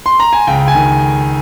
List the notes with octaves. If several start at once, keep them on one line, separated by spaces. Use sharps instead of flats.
C6
A#5
G#5
C#2 G5
G#5
D#3